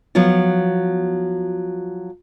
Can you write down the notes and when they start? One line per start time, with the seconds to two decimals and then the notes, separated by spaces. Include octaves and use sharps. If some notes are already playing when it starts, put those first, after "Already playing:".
0.15 F3 F#3 B3 F4